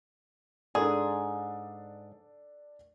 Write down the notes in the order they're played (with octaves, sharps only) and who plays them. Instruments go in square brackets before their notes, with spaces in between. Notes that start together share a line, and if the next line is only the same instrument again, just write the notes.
[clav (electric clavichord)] G#2 [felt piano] D4 A4 D5 [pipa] G#4